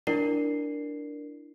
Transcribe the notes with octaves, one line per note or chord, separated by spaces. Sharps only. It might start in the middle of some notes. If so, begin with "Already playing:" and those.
D4 E4 A#4 D5 C7